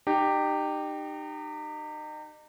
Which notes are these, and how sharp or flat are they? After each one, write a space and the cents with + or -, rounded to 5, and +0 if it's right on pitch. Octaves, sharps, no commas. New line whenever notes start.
D#4 -35 G4 +0